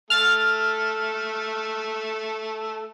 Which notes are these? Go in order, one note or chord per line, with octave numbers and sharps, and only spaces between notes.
A3 A4 F6 A6